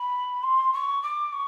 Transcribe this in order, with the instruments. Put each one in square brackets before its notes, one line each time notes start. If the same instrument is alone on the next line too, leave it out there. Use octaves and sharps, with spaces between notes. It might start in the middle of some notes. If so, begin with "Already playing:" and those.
Already playing: [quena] B5
C6
C#6
D6
C#6